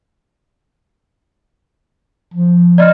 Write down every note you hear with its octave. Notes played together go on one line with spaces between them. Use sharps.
F3
D5 D#5 F6